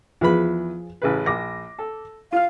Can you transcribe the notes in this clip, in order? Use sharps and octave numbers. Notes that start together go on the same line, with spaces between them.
E2 F3 G#4 B4 B5
A1 C#3 B4
A#1 D6 A#6
A4
F4 F5 F6